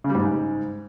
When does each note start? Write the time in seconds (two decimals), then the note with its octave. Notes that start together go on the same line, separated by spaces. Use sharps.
0.04 C#3
0.10 G3
0.15 G#2